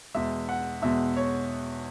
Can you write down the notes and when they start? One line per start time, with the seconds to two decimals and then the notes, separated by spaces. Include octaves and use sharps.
0.15 E2 B2 G#3 E5
0.49 F#5
0.82 E2 B2 G#3 E5
1.17 C#5